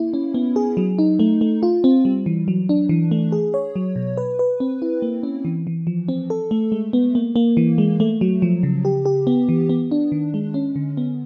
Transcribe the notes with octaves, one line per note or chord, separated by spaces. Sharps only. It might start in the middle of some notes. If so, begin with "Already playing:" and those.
Already playing: A#3 E4
C#4
B3
G#4
F#3
D#4
A3
A3
F4
C4
G3
E3
F#3
D4
E3
A3
G#4
C#5
F#3
B2
B4
B4
C4
E4
A#3
C#4
E3
E3
F3
C4
A4
A3
G#3
B3
A#3
A#3
E3
G#3
A3
F#3
F3
C#3
G4
G4
B3
E3
B3
D4
D#3
G#3
C#4
D3
B3